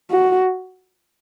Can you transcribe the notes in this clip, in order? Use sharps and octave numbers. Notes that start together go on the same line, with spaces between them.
F#4